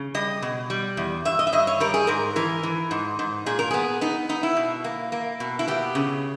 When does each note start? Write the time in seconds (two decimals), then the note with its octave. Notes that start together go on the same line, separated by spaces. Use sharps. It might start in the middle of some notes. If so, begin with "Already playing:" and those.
Already playing: C#3
0.15 G3 D#5
0.42 B2
0.70 G3
0.97 E2
1.25 G2 E5
1.39 D#5
1.47 E5
1.53 G2 D#5
1.67 C#5
1.80 G3 A#4
1.94 G#4
2.07 G#2 A#4
2.36 E3 A#4
2.63 E3
2.91 G#2
3.19 G#2
3.46 A#2 G#4
3.59 A#4
3.71 B3 G#4
4.01 B3 D#4
4.29 B3 D#4
4.43 E4
4.57 B2
4.84 A#3
5.12 A#3
5.40 B2
5.59 E4
5.68 B3 G4
5.95 C#3